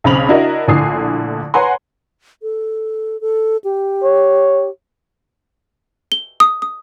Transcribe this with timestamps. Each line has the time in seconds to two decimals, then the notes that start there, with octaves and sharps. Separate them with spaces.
0.04 B1 C#3 C4 B5 F7 F#7
0.29 D4 E4 F#4 A#4 D#5
0.68 A#1 A2 D3 G#5 D#6 C7
1.54 B4 C#5 F#5 G#5 A#5 C6
2.42 A4
3.21 A4
3.64 G4
4.04 C#5
6.12 G7
6.40 D#6
6.62 D#6